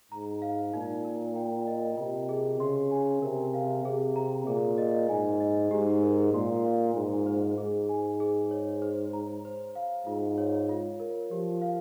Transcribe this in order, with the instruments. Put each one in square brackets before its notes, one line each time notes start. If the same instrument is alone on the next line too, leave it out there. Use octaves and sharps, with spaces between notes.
[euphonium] G#2 [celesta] A#5
[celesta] F5
[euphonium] A#2 [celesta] D#4
[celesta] A#4
G5
D#5
[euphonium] C3 [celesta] F4
[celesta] G#4
[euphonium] C#3 [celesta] C6
[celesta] G#5
[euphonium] C3 [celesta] A#4
[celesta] F5
[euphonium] C3 [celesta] G#4
[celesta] A#5
[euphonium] A#2 [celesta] G#4
[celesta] D#5
[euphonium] G#2 [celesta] G#5
[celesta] D#5
[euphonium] G#2 [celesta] G4
[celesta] A#4
[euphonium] A#2 [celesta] C6
[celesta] F5
[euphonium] G#2 [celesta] F4
[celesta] C5
[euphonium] G#2 [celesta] G#4
[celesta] G#5
G#4
C#5
C5
A#5
C5
F5
[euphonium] G#2 [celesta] F4
[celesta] C#5
F4
A#4
[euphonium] F3 [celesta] G4
[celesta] F5